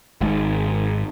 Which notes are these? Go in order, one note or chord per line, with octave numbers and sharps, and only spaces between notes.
G#1 G#2